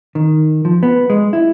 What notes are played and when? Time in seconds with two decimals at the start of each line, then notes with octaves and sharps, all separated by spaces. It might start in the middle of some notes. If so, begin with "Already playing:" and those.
0.15 D#3
0.65 F3
0.83 B3
1.10 G#3
1.33 E4